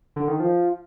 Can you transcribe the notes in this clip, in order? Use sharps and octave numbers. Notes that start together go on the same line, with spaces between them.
D3
D#3
F3